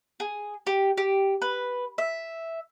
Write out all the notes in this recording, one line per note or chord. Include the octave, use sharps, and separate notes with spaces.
G#4
G4
G4
B4
E5